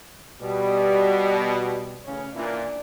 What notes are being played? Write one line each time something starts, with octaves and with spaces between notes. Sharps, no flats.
B2 G3
A1 C#3 C#4
A#2 E3 D4